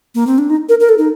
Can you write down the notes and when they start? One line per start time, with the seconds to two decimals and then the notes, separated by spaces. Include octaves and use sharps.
0.15 A#3
0.27 C4
0.38 D4
0.50 D#4
0.69 A#4
0.80 A#4
0.89 A4
0.98 D#4